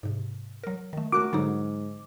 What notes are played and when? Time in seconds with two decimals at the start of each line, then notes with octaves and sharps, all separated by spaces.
0.03 G#2 C3
0.63 F#3 A#4
0.93 D#3 A3
1.12 A3 C#4 F#4 A#4 D6 F#6 D7
1.33 G#2 D3 F#3 D#4